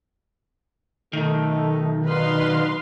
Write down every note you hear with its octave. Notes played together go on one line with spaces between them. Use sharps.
B1 D#3 A3 D#4
B2 D4 D#4 B4 F5 C6